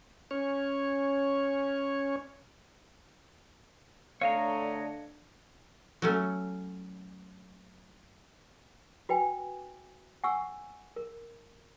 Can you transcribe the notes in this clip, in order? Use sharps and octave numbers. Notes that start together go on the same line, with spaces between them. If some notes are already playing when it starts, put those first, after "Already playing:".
C#4 C#5
D3 A3 D4 C#5 D#5 F5 A#5
F#3 A3 C#4
F#4 B4 G5 G#5
F#5 G#5 C#6 E6
A#4